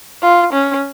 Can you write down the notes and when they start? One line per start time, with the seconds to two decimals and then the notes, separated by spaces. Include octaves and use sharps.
0.22 F4
0.53 C#4